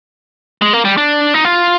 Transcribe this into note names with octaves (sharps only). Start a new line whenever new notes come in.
G#3
A#3
G3
D4
D#4
F4